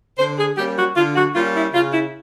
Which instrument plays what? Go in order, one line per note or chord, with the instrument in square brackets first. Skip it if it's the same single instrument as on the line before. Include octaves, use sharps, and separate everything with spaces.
[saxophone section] D3 C5
G#4
G3 A#3 C#4 G4
F#4
D3 F4
F#4
G3 A#3 C#4 F4
E4
C#3 F4
E4